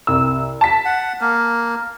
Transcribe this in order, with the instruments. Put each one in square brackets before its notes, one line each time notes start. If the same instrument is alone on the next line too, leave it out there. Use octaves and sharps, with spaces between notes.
[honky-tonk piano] C2 E6
A5 B6
[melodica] F#5
A#3